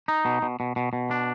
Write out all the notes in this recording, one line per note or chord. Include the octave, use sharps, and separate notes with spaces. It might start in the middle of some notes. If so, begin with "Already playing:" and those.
D#4
B2
B2
B2
B2
B2
D4